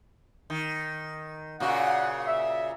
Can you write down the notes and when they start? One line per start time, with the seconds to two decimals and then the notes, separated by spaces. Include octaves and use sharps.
0.50 D#3
1.60 A#2 C#3 F#4 F#5
2.27 E5